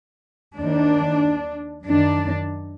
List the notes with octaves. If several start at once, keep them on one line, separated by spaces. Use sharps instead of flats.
D#2 D#3 D4
F#2 D#3 D4